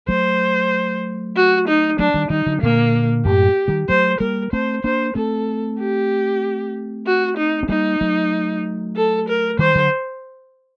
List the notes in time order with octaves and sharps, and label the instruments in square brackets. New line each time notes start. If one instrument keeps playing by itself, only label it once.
[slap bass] F#3 A3 [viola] C5
[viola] F#4
D#4
[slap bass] F#3 A3 [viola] D4
[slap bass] D#3 G3
[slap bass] D#3 G3 [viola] D#4
[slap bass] D3 F#3
[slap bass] A#2 D3 [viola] A#3
[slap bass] F#2 A2 [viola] G4
[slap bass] D#3 G3
[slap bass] F#3 A3 [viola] C5
[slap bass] G3 A#3 [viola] A#4
[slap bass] A3 C4 [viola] C5
[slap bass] A#3 D4 [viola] C5
[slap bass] A3 C4 [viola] A4
[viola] G4
F#4
D#4
[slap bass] C4
[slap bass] G3 A#3 [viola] D#4
[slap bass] F#3 A3
[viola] A4
A#4
[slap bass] D#3 G3 [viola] C5
[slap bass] D3 F#3